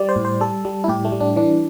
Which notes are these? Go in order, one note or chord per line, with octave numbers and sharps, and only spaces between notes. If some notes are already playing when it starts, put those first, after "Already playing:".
Already playing: G3 D5
C5
A2
C5
G3 A4
G3
E4
A2 G4
A3
G3
D4
E3 D4